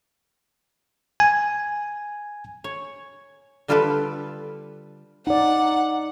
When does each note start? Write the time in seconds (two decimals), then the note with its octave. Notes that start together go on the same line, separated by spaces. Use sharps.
1.20 G#5
2.64 C#5
3.68 D3 G3 F4 G4 A4 B4
5.27 D#4 D5 F#5